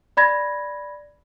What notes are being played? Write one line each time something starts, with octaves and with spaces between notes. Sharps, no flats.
D5 B5 G#6 A#6